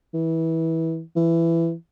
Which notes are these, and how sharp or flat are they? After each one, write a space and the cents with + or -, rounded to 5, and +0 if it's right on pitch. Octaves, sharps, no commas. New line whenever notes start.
E3 -20
E3 +15